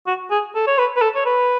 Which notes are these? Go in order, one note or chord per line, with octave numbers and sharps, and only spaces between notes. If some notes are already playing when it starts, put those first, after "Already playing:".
F#4
G#4
A4
C#5
B4
B4
A4
C#5
B4